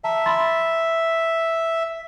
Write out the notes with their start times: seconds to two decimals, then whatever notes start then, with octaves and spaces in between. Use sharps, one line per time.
0.04 E5 A5 A#5
0.26 B5 C6 A6